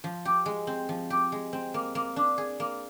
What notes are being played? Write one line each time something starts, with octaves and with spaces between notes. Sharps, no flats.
F3
G4
G#3
C4
F3
G4
G#3
C4
A#3
A#3
D4
G#4
A#3